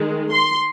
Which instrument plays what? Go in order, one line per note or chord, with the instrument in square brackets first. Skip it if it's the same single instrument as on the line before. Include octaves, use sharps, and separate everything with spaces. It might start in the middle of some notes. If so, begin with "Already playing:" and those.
Already playing: [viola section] D#3 G#3
C6